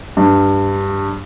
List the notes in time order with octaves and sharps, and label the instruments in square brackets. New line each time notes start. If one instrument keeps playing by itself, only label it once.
[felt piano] G2